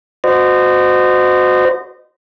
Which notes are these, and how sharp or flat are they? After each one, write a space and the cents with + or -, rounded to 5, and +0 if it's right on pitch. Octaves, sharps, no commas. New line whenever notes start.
F#4 -15 C5 -30 D#5 -25